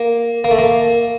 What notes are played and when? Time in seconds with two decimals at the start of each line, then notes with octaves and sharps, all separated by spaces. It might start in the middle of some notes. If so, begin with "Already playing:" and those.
Already playing: A#3
0.44 A#3
0.51 A3
0.58 A#3